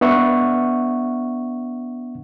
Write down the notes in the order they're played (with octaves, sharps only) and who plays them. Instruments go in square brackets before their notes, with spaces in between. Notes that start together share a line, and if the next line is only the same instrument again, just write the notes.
[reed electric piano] B3 D4 E5 F#5 C#6